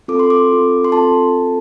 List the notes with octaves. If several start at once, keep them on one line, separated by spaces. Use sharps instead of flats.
C4 F4 A4 D6
C6
D6
C4 F4 A4
C6
C4 F4 A4 A5
C4 F4 A4